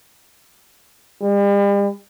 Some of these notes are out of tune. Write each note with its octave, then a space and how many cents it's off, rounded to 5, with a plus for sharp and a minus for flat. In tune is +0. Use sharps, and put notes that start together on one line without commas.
G3 +40